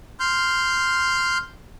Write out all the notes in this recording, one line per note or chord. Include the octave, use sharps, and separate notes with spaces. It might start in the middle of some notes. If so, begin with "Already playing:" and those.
C6 F6 G6